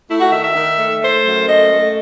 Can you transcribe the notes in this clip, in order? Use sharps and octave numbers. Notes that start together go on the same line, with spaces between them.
A3 E4
F#4
D#3 E5
E5
D#3
A3
A3 C5
F#2
A3 D#5
A3